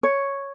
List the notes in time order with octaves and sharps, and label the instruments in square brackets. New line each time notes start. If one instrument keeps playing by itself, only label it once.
[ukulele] C#5